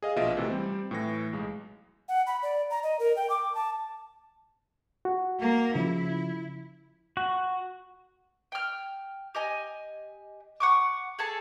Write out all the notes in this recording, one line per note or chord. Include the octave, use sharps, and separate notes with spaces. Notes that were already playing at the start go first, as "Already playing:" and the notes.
G#4 D#5 F5
A#1 B2 F4 D#5 E5 D7
C3 E3 A3 B3
G3 C4
A2 E3 A#6
B1 G#3
F#5
B5
D5
A#5
D#5
A#4
G5
D6
A5
F#4
A#3
C#3 F3 E4
F#4
G5 F6
G4 D#5 G#5
F#5 C#6 D6
G#4 A4 A5